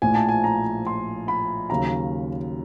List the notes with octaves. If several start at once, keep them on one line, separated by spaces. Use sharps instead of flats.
A#1 A2 F3 A3 G#5
A5
G#5
A#5
C6
B5
D#2 C#3 F#3 A#5